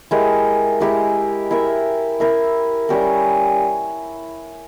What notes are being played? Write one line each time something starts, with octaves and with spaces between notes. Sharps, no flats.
G#3 E4 G4 A#4
G#3 E4 G4 A#4
E4 A#4 E5
E4 A#4 E5
G3 C#4 G4 A#4